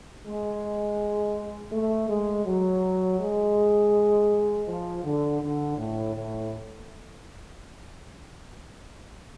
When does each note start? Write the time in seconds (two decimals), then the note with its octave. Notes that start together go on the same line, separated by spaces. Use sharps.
0.25 G#3
1.72 A3
2.09 G#3
2.46 F#3
3.20 G#3
4.67 F3
5.04 D3
5.42 D3
5.77 A2
6.14 A2